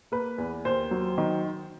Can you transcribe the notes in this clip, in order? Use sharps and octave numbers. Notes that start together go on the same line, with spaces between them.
A#3 B4
E2
D#2 C5
F#3
D#3